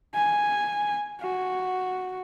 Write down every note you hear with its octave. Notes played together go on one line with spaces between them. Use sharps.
G#5
F#4